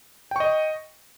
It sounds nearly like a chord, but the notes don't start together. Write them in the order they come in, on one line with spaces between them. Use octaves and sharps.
G5 C#6 D#5